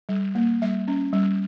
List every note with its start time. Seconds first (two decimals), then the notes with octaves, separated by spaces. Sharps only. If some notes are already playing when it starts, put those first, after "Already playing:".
0.09 G3
0.35 A#3
0.62 G3 E5
0.88 C#4
1.13 G3